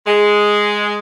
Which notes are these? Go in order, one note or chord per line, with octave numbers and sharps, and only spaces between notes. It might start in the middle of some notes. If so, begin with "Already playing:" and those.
G#3